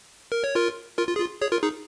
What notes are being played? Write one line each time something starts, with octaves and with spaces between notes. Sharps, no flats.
A#4
C#5
F4 A#4
F4 A#4
F4
G#4
F4
G#4 C#5
F4 A#4
D#4 G#4